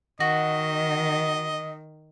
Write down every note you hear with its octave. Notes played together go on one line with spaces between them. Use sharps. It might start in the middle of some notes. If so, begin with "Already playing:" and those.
D#3 F#4 D#5